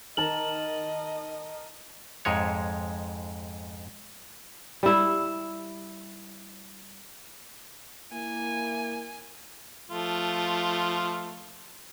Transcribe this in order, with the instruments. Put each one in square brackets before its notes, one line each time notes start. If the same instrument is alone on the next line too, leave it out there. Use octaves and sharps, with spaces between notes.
[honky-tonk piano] D#3 [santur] A#4 A5 A#5 [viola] D#5 [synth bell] F#7
[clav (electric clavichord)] F2 G#2 G#3 C#5
[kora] G3 E4
[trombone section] A#3 E4 [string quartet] G#5
[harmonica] F3 A3 F4